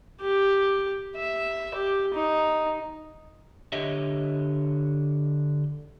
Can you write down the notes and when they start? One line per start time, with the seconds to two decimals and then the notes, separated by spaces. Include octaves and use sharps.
0.22 G4
1.17 E5
1.75 G4
2.14 D#4
3.73 D3 G4 C#5 D#5 E5